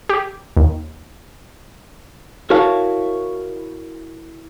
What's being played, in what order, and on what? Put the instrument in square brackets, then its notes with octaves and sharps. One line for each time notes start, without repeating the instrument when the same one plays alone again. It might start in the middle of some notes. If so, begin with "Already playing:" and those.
[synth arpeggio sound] G4
D#2
[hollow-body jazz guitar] E4 F#4 A#4 C#5 F5 A5